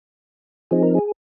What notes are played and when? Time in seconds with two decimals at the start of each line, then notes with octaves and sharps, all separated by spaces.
0.71 F3 C4 D#4 G#4
0.83 A#4
0.95 G#4